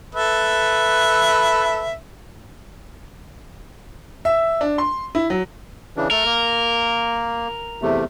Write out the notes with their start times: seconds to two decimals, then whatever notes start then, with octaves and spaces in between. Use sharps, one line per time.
0.15 A4 B4 E5
4.25 E5
4.61 D4
4.78 C6
5.15 E4
5.30 F#3
5.97 C#3 E3 D4
6.11 A3 A4 A#4
6.25 A#3
7.82 E2 C3 A3